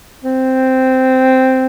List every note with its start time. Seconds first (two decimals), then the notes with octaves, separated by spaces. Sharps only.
0.24 C4